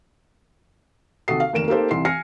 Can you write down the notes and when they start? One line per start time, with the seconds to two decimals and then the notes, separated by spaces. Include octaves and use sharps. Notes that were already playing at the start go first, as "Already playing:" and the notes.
1.28 D#2 C3 F#4 A4 D#6 C7
1.40 F5
1.53 F1 D#2 A#4 D7 E7
1.68 A#3 D#4 G4 A4 C5
1.91 C2 E3 C6 C7
2.05 G#5 F6 A#6 C7 C#7